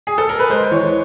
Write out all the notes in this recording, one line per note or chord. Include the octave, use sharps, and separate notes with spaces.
G#4
A4
A#4
B4
G#3 C5
E3 C#5